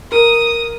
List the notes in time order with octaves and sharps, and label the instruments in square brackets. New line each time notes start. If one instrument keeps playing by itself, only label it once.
[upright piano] A#4 [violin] D#6